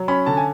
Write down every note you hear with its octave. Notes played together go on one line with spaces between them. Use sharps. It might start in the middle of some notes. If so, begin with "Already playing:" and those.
Already playing: F#3
C#4 B5
D3 A5
G#5